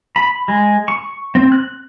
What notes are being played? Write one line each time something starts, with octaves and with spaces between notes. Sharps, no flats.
B5
G#3
C#6
C4
F#6